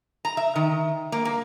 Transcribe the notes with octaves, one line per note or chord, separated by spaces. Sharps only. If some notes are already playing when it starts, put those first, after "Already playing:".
A#5
E5
D#3
A#3
A#3